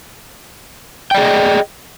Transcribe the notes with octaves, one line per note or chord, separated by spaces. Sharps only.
G#4 D5 D#5 G5